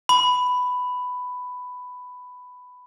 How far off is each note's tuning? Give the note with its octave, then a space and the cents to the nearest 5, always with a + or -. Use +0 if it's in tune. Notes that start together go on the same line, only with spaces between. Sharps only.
B5 +10